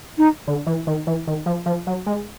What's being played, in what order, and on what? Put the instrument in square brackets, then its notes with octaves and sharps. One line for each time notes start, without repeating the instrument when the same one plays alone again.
[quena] D#4
[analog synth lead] D3
E3
D#3
E3
D#3
F3
F3
F#3
G#3